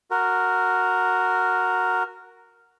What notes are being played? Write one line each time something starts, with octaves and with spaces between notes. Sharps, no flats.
F#4 A#4